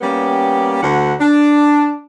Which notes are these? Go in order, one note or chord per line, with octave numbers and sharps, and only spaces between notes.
G3 A#3 B3 C#4 G4
D2 F#5
D4